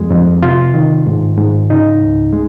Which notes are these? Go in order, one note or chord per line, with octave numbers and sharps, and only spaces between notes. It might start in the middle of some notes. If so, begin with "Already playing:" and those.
Already playing: F2 G#3
F2
C3 F4
D#3
G#2
G#2
C#3 D#4
C#2
G#3